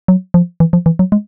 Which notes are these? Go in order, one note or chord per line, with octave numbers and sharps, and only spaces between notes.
F#3
F3
E3
F3
E3
F#3
G#3